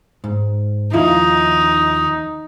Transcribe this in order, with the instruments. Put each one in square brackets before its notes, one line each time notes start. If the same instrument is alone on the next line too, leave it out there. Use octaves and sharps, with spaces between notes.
[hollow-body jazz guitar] G#2
[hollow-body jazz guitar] D#2 F3 E4 [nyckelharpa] D#4